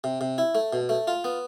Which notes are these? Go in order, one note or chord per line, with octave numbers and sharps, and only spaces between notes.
C3
C3
E4
A3
B2
A3
F4
B3